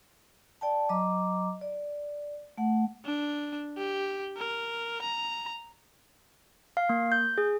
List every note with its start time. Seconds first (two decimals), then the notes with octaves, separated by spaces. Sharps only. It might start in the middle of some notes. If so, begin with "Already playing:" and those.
0.61 D5 G5 A5
0.89 F#3 D#5 A#5 D6
1.61 D5
2.58 A3 F#5
3.06 D4
3.78 G4
4.38 A#4
5.02 A#5
6.77 F5
6.89 A#3
7.12 G6
7.38 G#4